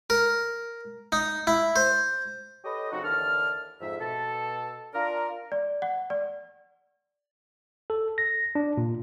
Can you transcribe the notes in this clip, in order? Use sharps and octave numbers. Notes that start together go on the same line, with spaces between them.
A#4
D#4
E4
C5
G4 A4 B4 C#5 D#5
C#3 F#3 C4 D#4 F#4
D#2 D3 E3 D4 A5 F6
F2 G#2 E5
B2 A4
D4 F4 A#4
D5
F#5
D5
A4
A#6
D4
A#2